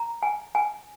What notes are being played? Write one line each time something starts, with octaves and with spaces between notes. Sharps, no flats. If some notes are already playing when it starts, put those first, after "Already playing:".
Already playing: A#5
G#5
G#5